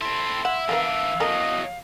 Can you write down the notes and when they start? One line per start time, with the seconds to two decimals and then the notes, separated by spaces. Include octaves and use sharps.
0.01 C4 E4 A4 C6
0.45 E4 E5 F#5
0.69 E3 A#3 B3 D4 A#4 F5
1.20 E2 F#3 A4 A#4 D#5